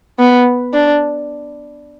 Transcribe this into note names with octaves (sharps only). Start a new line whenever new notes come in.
B3
D4